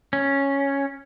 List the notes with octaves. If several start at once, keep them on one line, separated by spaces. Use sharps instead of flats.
C#4